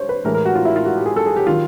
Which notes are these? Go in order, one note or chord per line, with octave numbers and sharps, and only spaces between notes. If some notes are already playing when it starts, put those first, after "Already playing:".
Already playing: C5 C#5
B4
A2 E3 G#3 A#4
A#4
F#4
F4
E4
F4
F#4
G4
G#4
A4
G#4
G4
D#3 F#3 F4